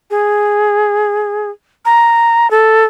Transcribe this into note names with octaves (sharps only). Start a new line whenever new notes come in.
G#4
A#5
A4